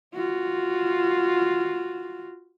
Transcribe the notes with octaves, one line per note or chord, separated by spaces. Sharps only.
F4 F#4